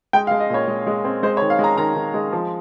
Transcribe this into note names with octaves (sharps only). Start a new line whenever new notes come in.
G#3 G5
F5
G#3
D#5
A#2 C#5
G#3
G#3
C4
G#3 C5
C#5
D#3
F5
G#3
A#5
D#3 A#5
D#3
G#3
F3